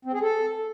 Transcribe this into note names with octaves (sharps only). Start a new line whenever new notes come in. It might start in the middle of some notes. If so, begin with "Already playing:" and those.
C4
G#4
A4